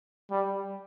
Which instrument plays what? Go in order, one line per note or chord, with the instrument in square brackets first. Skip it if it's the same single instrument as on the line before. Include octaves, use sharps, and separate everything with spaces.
[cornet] G3